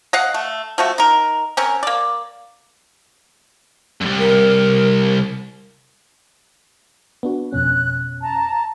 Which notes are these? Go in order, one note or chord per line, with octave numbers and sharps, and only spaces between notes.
D#5 F5 F#5
A3
F3 A3 F#4
D#4 A#4
C4 C#4 A#4
A#3 D5
C2 F#2
A#4
B3 D4 F#4
F2 B2 C#4 F#6
A5 A#5